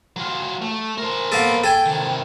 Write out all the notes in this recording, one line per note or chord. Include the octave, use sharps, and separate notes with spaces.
F#3 F4
A3
A#4 C5
A#3 B3 A4
A4 G5 G#5
C3 D#3